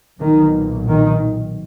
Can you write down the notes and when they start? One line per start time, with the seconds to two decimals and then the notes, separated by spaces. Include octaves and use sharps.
0.20 B1 A#2 D#3
0.88 D#3